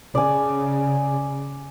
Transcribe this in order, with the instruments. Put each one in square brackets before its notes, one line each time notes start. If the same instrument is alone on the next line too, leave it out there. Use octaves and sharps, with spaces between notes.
[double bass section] C#3 [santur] D5 G#5